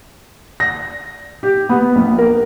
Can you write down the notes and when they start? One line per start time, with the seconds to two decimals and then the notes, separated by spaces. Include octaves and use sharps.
0.60 A#6
1.43 G4
1.69 B3
1.95 A#1
2.18 A#4